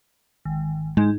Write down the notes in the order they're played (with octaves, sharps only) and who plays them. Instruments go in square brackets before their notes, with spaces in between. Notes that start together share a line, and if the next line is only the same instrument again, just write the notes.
[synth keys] G#1
[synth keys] G#2 [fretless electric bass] G#3